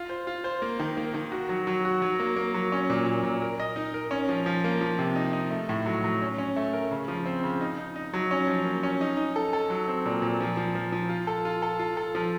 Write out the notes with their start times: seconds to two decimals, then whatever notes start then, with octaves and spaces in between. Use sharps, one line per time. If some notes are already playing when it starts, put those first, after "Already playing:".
Already playing: F4
0.09 C5
0.27 F4
0.44 C5
0.62 A#3
0.80 D#3
0.97 A#3
1.14 D#3
1.32 F#4
1.49 F#3
1.67 F#3
1.85 F#4
2.02 F#3
2.20 A#3
2.36 A#3
2.54 F#3
2.72 C#4
2.90 A#2
3.06 A#2
3.23 A#2
3.42 A#4
3.60 D#5
3.76 D#4
3.94 A#4
4.11 C#4
4.29 F3
4.46 F3
4.64 A#3
4.81 F3
4.99 C3
5.15 D#4
5.33 D#4
5.51 A3
5.69 A2
5.86 F#3
6.04 F#3
6.21 C#4
6.38 C#4
6.56 A3
6.73 A#4
6.91 C#3
7.08 F3
7.26 C4
7.44 C#3
7.61 D#4
7.78 D#4
7.96 D#4
8.14 F#3
8.31 C#4
8.47 F3
8.65 A#3
8.83 C#4
9.01 D#4
9.17 D#4
9.36 A4
9.53 A4
9.70 F#3
9.88 C4
10.06 A#2
10.22 A#2
10.40 F3
10.57 F3
10.75 F3
10.92 F3
11.09 F4
11.27 A4
11.45 F4
11.62 A4
11.79 F4
11.97 A4
12.15 F3